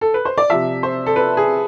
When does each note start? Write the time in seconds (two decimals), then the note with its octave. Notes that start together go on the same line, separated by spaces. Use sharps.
0.01 A4
0.14 B4
0.25 C5
0.38 D5
0.50 C3 F3 E5
0.83 C5
1.06 A4
1.16 B4
1.37 G#4